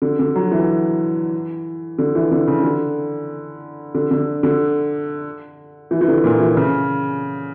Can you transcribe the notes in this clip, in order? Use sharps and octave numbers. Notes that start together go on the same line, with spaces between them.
D3
D3
F#3
E3
D3
E3
D3
C#3
D3
D3
D3
D3
E3
E3
D3
A#2
E3
C#3